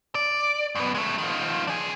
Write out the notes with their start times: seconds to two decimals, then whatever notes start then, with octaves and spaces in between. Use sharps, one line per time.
0.15 D5
0.75 F#2 B3
0.95 G#3 A3
1.18 D#3 F3
1.67 D4 G#4